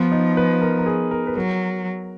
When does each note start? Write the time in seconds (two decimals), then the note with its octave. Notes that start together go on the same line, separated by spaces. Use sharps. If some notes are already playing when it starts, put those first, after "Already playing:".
Already playing: F3 B3
0.12 D#4
0.37 B4
0.61 A#4
0.79 A#4
0.86 G#4
1.11 A#4
1.27 B4
1.35 F#3 A#4